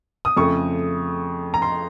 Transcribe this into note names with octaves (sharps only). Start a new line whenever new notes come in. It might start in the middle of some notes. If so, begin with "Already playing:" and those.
D#6
F2 C#3 A3 C#6
A#5
C6